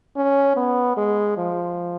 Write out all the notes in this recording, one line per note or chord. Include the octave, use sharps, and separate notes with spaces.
C#4
B3
G#3
F3